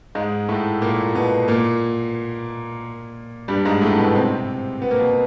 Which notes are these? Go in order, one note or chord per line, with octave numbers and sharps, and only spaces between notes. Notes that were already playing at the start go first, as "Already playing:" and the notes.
G#2 G#3
A2 A3
A#2 A#3
B2 B3
A#2 A#3
G2 G3
G#2 G#3
A2 A3
B2 B3
C3 C4
B3
A#3
B2 B3